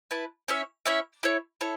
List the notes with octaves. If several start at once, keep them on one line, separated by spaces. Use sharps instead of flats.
E4 B4 A5
C#4 E4 C#5 E5
C#4 E4 C#5 E5
E4 A4 C#5
E4 A4 C#5